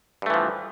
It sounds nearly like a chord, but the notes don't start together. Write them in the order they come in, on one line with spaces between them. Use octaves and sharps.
G2 A3 E3 F3